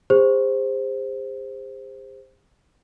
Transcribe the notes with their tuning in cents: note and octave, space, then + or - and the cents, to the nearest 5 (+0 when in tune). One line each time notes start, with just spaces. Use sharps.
G#4 -45 C5 +0